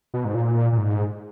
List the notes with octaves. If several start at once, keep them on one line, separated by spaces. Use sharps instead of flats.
B2
G#2
A#2
A#2
G#2